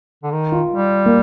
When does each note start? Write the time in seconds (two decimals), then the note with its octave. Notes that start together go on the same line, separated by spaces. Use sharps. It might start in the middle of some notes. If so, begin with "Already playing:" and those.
0.23 D3
0.32 D#3
0.52 F4
0.73 G3
1.06 A#3